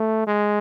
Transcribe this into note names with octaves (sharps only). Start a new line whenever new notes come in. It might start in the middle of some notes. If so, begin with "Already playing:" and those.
Already playing: A3
G#3